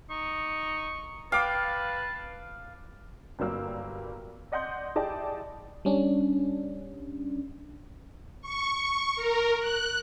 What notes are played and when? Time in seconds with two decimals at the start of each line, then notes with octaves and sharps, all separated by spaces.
0.10 D#4 C#6
1.32 B4 F5 G5 A5 D6
3.39 G1 F#3 G3 A#3 E6
4.52 D5 D#5 F#5 C6 G6
4.95 E4 G4 G#4 D5 D#5 A5
5.85 G3 C#4 D4
8.42 C#6
9.16 A#4
9.60 F#6